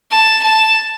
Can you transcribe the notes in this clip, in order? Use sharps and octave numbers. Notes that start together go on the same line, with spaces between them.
A5
A5